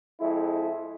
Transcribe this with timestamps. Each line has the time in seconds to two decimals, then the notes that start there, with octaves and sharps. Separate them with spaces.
0.19 F2 G#3 E4